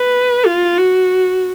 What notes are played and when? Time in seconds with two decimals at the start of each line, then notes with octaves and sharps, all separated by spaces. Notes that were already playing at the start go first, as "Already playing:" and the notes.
Already playing: B4
0.45 F4
0.78 F#4